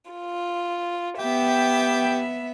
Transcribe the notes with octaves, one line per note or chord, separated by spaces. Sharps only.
F4
B3 G4 E5 G5